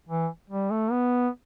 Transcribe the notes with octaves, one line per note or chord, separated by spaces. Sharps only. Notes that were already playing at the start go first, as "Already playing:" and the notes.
E3
G3
A3
B3